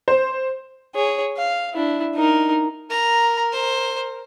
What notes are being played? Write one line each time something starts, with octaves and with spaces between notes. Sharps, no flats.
C5
G#4 C#5
F5
D4 E4
D#4 A#4
A#4 A#5
C5